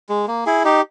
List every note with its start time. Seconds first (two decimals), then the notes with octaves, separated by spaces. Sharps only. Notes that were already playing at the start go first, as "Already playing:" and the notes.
0.09 G#3
0.28 A#3
0.46 E4 G#4
0.64 D#4 G4